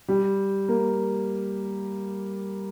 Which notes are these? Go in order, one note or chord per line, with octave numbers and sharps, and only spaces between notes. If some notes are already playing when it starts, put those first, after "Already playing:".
G3
A#3